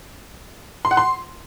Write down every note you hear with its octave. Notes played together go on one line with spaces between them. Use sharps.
C6
F#5
C6